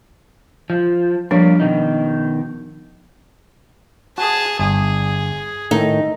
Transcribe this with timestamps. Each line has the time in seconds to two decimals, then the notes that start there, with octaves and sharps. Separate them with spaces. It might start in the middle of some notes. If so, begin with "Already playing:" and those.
0.70 F3
1.31 F3 G3 A#3 D4
1.60 B2 D#3 D#4
4.18 F#4 G#4 A5
4.59 G1 G#4
5.71 A2 D#3 A3 D#4